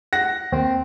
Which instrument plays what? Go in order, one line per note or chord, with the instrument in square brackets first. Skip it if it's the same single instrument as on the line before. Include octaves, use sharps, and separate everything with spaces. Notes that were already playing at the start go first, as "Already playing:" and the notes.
[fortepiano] F#5 [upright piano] A#6
[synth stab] D#2 [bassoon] C4